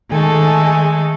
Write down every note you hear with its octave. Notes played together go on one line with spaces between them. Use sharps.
D#3 G#3 A3 A4 G#5